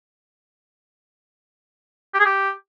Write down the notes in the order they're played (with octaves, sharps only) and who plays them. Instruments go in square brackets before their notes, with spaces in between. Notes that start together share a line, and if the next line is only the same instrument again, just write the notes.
[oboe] G4
G#4
G4